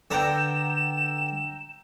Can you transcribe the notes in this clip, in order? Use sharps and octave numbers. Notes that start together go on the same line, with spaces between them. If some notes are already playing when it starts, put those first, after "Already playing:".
D3 B3 G5 A#5 E6 E7